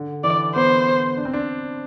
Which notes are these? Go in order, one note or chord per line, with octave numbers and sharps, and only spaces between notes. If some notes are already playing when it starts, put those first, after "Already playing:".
Already playing: D3
E3 D5
B3 C5
D4
C4
D4